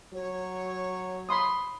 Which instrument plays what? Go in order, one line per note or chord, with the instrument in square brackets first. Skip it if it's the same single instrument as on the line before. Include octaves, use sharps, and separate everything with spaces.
[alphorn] F#3 [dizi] C#5
[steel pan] B5 C6 D#6